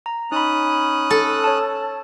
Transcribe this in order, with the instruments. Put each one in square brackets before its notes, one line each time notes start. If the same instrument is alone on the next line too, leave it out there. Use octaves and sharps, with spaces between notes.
[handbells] A#5
[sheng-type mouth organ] C#4 D#6 F#6 [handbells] D#4 B5
[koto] A4
[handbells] C#5 A5